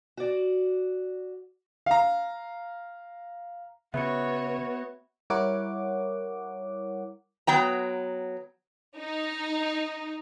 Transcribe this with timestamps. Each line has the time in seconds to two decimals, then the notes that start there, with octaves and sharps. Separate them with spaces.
0.17 F#4 D5
1.86 F5 A#5
3.94 C#3 B3 F#4 C#5 E5 B5 C#7
5.30 G3 E4 A#4 C#5 F#5 D6
7.47 F#3 B3 G5 A#5
8.97 D#4